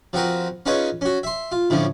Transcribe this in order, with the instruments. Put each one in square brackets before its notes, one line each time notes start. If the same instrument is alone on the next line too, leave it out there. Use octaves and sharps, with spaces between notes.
[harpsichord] F3 C4 F#4 A#4 B4
C#4 D#4 F4 G#4 B4 C#5
C#4 F#4
E5 C6
F4
A2 D3 F3 C#4